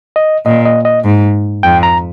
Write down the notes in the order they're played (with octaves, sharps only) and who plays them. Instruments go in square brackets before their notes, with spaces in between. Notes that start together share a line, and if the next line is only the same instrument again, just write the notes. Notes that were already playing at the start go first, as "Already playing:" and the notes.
[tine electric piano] D#5
[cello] A#2 [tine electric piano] D#5
[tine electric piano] D#5
D#5
[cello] G#2
[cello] F2 [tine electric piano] G5
[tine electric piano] A#5